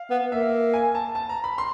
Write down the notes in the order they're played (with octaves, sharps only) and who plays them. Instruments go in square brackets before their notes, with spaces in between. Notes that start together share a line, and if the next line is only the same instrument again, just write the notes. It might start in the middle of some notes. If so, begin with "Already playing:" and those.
Already playing: [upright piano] F5
[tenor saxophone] B3
[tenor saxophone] A#3 [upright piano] E5
[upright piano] G#5
A5
A5
A#5
B5
C6